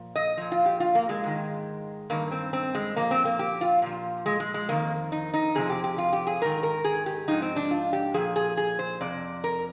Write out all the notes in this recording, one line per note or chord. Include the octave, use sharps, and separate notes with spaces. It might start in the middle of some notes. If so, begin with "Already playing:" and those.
Already playing: A#2 F3
D#5
A#2 F3
F4
G4
F4
A#3
G#3
G#2 D#3
G2 D#3 A#3
C4
C4
G#3
A#2 F3 A#3
C4
A#3
G4
F4
A#2 F3
G#3
G#3
G#3
F2 D#3 A#3
D#4
D#4
F2 C3 F3 G#4
G4
G4
F4
G4
G#4
G#2 D#3 A#4
A#4
G#4
G4
G#2 F3 D#4
C4
D4
F4
G4
A#2 F3 G#4
G#4
G#4
C5
F2 C3 D5
A#4